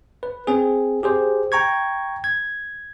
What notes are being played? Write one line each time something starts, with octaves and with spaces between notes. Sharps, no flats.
B4
C4 G#4
G4 G#4 C5
G5 A#5 C#6 G#6
G#6